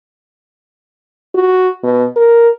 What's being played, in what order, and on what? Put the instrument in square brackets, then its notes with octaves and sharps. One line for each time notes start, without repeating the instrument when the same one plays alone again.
[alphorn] F#4
B2
A#4